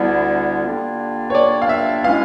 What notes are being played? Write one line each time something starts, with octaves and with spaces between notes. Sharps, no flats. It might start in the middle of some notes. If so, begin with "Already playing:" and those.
Already playing: D2 D3 G3 B3 E4
D3 G3 A#3 D4 F4
C#5
D5
F5
E5
B2 G#3 C#4 E4 F5